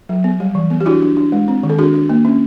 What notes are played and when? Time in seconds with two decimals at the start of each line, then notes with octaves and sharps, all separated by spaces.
0.09 F#3
0.24 B3
0.40 G3
0.55 E3
0.70 B3
0.80 G4
0.86 D4 E4 F#4
1.02 D4
1.17 D4
1.32 G#3
1.48 C4
1.63 D#3
1.69 A4
1.79 D4 F#4 G#4
1.94 D4
2.09 A#3
2.25 C#4